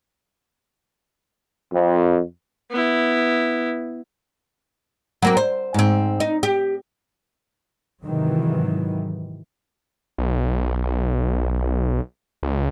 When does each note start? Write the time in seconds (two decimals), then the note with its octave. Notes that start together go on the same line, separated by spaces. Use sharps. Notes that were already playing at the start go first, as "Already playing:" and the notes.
1.72 F2
2.71 B3 E4
5.22 F#3 A#3 C4
5.37 C5
5.74 G#2 C4
6.20 D#4
6.43 G4
8.03 G#2 C3 D#3 E3 F#3
10.18 B1
12.43 C#2